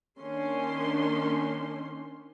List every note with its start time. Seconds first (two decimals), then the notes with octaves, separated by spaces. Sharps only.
0.22 D#3 A#3 C#4 D4 C6